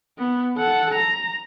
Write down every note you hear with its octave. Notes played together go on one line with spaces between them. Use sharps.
B3
A4 F#5
A#5